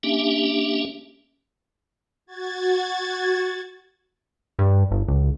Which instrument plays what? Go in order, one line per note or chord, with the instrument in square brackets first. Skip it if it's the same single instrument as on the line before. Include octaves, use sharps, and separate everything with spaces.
[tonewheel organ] A#3 C#4 D4 G4 E5
[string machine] F#4 G#6 A6
[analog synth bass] G2
G1
C#2